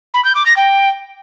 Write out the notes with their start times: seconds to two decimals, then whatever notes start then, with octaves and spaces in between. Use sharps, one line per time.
0.14 B5
0.25 G6
0.35 D6
0.46 A#6
0.56 G5